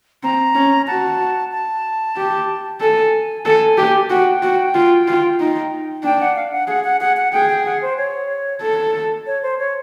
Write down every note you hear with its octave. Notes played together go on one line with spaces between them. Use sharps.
C4 A#5
C#4
F#4 A5
A5
G4
A4 G#5
A4 G#5
G4
F#4 G5
F#4
F4
F4
D#4
D4 G5
F#5
F5
F#5
G#4 F#5
F#5
G#4 F#5
F#5
G#4 G5
G5
F#5
C5
C#5
A4
C#5
C5
C#5